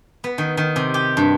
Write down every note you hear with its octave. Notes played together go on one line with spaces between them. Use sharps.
B3
D#3
D#3
C3
G4
G2